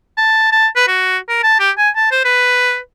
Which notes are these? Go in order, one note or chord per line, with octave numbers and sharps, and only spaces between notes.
A5
A5
B4
F#4
A#4
A5
G4
G#5
A5
C5
B4